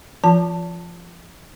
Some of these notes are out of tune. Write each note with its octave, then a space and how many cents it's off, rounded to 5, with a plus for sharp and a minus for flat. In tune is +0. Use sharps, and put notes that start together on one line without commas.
F3 -30 F4 +0 A5 +15